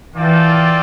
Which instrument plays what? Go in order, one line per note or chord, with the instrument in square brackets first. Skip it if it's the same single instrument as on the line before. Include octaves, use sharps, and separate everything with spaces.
[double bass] E3 [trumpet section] A#3 F4 A4 D5 G5